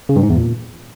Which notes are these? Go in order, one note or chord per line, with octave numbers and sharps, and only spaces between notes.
C#3
G2
G#2
E2
A#2